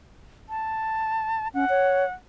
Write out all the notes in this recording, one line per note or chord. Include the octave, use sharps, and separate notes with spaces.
A5
C#4 F#5
C#5